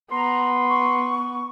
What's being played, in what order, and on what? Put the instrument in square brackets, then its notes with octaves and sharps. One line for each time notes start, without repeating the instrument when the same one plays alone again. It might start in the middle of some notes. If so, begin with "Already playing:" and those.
[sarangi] B3 [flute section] A#5 [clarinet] C6
[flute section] C#6